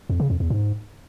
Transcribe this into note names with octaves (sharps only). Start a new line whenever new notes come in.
F2
C#3
F2
E2
G#2